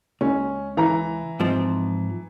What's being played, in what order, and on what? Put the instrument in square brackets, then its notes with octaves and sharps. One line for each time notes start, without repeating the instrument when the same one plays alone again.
[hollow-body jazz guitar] C#2 [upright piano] C#4
[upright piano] E3 A#5
[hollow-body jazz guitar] G#2 F3 C4